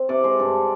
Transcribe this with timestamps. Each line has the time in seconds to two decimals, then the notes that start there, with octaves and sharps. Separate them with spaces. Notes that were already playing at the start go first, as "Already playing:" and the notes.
Already playing: C4
0.09 C3 D5
0.24 G#3 C5
0.40 G2